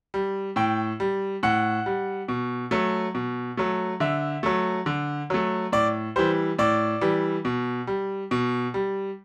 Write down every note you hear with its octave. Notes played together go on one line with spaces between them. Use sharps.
G3
A2 G5
G3
A2 F#5
G3
B2
F#3 A3
B2
F#3 A3
D3 E5
F#3 A3
D3
F#3 A3
A2 D5
E3 G3 C5
A2 D5
E3 G3
B2
G3
B2
G3